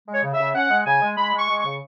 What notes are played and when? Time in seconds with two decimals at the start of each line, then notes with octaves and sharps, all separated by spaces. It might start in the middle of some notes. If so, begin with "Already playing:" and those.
0.08 G#3 C#5
0.24 C#3
0.34 E5
0.40 C#3
0.55 C#4 F#5
0.71 G#3
0.86 C#3 G#5
1.02 G#3
1.18 G#3 B5
1.33 G#3
1.39 C#6
1.49 G#3
1.59 C#6
1.65 C#3